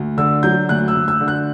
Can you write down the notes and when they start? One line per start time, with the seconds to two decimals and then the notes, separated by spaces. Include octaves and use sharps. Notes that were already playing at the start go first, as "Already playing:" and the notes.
Already playing: D2
0.18 D3 E6
0.43 F#3 G6
0.69 D2 F#6
0.88 E6
0.95 D2
1.08 E6
1.20 D3
1.28 F#6